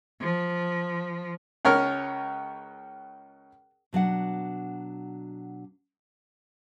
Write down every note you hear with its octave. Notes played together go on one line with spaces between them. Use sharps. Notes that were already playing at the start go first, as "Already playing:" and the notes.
F3
C#2 C#4 A#4 F6
B2 F#3 D4 F#5